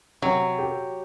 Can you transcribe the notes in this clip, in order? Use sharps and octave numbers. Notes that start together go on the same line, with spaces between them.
C3 F#3
G4